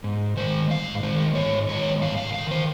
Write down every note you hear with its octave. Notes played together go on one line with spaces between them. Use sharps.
G#2
D#3 G#3 C5
G#2 F5
D#3 G#3 C5
G#2 C#5
D#3 G#3 C#5
G#2 F5
F5
D#3 G#3 F5
C5